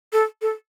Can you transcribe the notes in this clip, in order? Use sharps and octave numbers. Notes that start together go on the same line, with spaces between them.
A4
A4